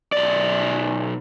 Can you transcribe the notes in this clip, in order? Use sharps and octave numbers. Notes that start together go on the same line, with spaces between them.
B1 D5